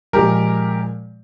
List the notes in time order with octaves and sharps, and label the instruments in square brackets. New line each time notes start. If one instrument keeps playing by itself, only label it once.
[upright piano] A#2 F3 G#3 G4 A#4